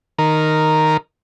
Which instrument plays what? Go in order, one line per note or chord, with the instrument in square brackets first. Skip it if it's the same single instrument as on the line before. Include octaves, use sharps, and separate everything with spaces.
[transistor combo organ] D#3 A#4